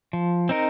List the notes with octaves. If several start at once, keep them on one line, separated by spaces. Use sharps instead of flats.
F3
C4 D#4 A#4